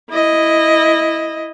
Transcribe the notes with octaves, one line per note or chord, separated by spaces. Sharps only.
E4 D#5